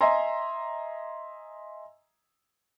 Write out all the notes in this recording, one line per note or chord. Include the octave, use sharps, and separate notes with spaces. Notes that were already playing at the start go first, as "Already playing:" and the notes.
D#5 E5 G#5 A#5 C6